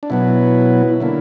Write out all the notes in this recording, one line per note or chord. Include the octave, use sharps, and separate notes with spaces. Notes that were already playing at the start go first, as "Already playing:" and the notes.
D4
B2 F#3 B3 E4
D3 A#3 E4